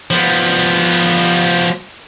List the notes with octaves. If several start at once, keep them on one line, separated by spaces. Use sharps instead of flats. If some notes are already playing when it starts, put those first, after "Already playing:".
F3 B3